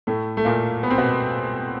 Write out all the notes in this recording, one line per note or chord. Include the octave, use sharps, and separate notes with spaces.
A2 A3
A3
A#2 A#3
B3
C4
B2 B3